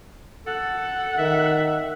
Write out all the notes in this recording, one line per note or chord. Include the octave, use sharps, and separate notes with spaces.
A4 F#5
D#3 E5